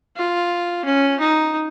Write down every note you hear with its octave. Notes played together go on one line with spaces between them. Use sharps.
F4
C#4
D#4